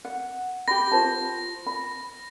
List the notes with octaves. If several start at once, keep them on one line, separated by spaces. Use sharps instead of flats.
F#5
G4 B5 A#6
F4 C5 A5
B5